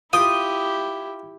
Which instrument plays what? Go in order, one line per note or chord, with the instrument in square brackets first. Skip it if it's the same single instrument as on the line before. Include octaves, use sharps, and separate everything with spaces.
[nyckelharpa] E4 G4 [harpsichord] F4 G5 [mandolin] D#6